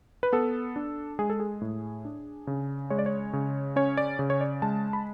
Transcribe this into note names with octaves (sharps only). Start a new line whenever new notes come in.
B4
B3 A4
D4
G#3 G#4
A4
G#4
A2
D4
C#3
G#3 C#5
D5
C#5
C#3
C#4 C#5
D5
C#3
C#5
D5
G#3 A5
B5